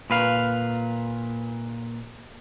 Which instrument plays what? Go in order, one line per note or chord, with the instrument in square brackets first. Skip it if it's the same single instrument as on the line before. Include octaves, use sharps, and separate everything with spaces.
[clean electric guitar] A#2 B4 F5